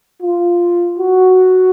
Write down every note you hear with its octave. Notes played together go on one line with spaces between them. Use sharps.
F4
F#4